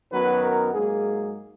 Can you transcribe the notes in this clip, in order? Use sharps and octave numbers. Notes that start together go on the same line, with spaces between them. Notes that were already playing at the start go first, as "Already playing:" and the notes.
F#2 D#3 F#3 B3 B4
A#4
G#2 F#3 A#3 G#4